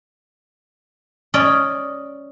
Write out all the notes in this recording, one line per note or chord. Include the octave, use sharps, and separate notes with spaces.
C#4 D5 D#5